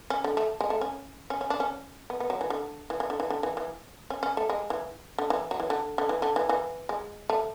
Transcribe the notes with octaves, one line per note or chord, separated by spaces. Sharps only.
C#4
D3
A3
G#3
A3
C#4
C#4
C#4
D4
C#4
B3
B3
F#3
E3
D3
E3
E3
D3
E3
D3
E3
E3
C#4
C#4
A3
G#3
E3
D3
E3
F#3
E3
D3
D3
E3
D3
E3
E3
G#3
A3